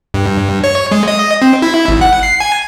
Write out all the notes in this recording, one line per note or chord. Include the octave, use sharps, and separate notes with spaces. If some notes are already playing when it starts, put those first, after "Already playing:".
G2
C#5
G#3
D#5
C4
E4
G#1
F#5
C7
G#5